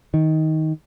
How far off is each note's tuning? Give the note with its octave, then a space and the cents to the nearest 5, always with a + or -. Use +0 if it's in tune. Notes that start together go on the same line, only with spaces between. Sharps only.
D#3 +15